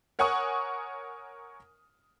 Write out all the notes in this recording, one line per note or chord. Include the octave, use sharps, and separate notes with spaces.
A#4 C#5 F#5 G#5 C#6 D#6